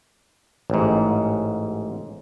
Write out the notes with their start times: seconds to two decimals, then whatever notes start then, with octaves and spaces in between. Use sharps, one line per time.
0.70 A1 G#2